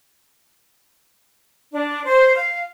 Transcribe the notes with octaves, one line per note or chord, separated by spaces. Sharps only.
D4
C5
F5